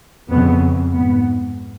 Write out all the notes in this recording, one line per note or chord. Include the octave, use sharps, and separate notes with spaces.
F2 C#3 B3
G#2 B3